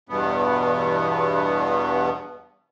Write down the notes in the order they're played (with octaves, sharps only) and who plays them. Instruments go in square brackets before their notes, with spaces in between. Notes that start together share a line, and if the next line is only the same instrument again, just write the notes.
[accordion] E2 G2 B2 B3